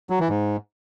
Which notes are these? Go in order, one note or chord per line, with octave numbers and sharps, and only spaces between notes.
F#3
E3
G#2